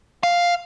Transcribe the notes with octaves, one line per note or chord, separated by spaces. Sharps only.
F5